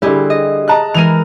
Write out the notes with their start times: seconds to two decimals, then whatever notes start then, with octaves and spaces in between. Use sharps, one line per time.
0.02 D3 G3 E4 G4 G#4
0.30 D#5
0.68 D#5 A5 A#5 F#6
0.94 E3 G#3 A#4 D#7 F7